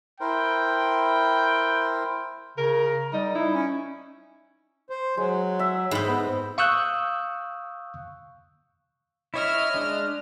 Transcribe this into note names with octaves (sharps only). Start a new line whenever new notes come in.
E4 A#4 C5 G5
C#3 A#4
G3 D#4
D#4 E4
C#4
C5
F#3 G#3
E5
G#2 C4 B4
B3
F5 C#6 D#6 E6 F#6 G6
E4 C#5 D#5 E5 F6
G#3 D4